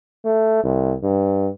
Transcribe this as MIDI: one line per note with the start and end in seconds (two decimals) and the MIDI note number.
0.25 0.59 57
0.64 0.95 36
1.03 1.48 43